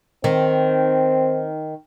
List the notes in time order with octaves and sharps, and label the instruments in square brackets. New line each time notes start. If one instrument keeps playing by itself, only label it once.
[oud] D#3 [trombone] C4